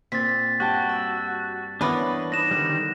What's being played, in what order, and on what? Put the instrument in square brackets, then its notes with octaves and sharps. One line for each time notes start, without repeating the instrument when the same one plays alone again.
[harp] A#2 [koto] C4 [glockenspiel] A6 B6
[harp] G2 G5 A5 [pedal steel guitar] F#4
[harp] E6
[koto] E3 B3 [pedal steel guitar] D4 B4 D6 [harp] A#4 C#5 F6
[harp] D#4 C5 F#6 [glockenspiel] A#6 E7
[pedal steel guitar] D3 D#3 G3 [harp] F#5 F#6